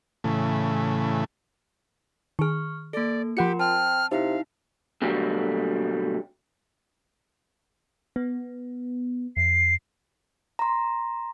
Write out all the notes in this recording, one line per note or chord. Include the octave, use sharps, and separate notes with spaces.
A2 C#3 E3 A3
D#3 G#4 C#6 F6
A#3 A4 D5
F3 F4 G4 A#4 F#5 C6 C#7
C4 A5 F6
C3 D#4 E4 F5
B2 D3 F#3 G3 A3 A#3
B3
F2 C7
A#5 C6